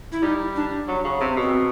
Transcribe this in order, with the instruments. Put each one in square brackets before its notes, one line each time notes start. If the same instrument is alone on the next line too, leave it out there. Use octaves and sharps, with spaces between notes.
[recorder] E4
[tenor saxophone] G3 [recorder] D#4
[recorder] D4
[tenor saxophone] F#3
C#3
[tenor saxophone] C3 [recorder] C4
[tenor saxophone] B2
[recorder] C4